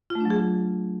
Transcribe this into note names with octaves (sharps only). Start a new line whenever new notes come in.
F4
A3
D4
F#3
G#4